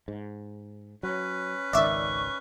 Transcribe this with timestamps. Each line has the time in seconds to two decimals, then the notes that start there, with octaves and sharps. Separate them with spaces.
0.08 G#2
1.03 F#3 C#4 B4
1.73 G#1 C#2 D#3 D5 E5 C#6